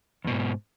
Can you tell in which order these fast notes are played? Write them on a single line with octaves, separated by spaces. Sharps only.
E2 B2 G#2